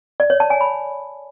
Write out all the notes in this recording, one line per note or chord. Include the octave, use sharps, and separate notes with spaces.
D5
C#5
A5
G#5
B5